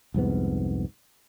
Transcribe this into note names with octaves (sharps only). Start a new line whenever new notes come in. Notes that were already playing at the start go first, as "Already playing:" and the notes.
C2 F2 G#2 B3